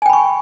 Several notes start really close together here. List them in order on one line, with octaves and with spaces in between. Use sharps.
G#5 G5 B5 C#6